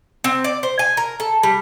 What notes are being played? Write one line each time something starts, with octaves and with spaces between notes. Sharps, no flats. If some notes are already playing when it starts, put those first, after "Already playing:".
C4
D5
C5
G#5
A#4
A4
G3